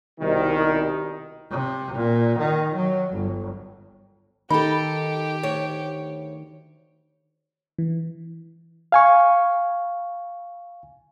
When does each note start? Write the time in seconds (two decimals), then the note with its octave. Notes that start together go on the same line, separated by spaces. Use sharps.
0.20 C2 B2 D#3
1.51 C3
1.95 A#2
2.39 D#3
2.75 F#3
3.14 G1
4.50 D#3 D#4 G4 A4 B5
5.43 D2 C#5
7.78 E3
8.92 F5 G#5 C#6